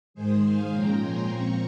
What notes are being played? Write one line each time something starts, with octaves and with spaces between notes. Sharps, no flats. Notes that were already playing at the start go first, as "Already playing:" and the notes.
G#2 D#3 G#3 G#4 C5
F5 G#5
A#2 F3 G#3 C#4 G5 A#5
G#5 C6
A#2 F3 C4 A#5 C#6